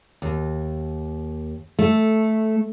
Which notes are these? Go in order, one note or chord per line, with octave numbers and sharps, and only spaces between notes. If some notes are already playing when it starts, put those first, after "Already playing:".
D#2
A3